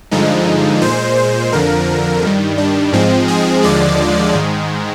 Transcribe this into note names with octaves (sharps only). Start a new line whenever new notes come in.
G2 D3 F3 G#3 D#4
A#2 G#3 C5
C5
F2 D3 F3 A#4
G2 D#3 G3
D4
G#2 F3 G#3 C4
G#4
D#2 D3 F3 G#3 D5
G#2 D#3 G#3